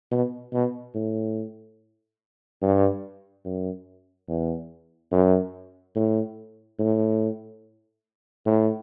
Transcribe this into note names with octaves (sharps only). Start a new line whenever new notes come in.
B2
B2
A2
G2
F#2
E2
F#2
A2
A2
A2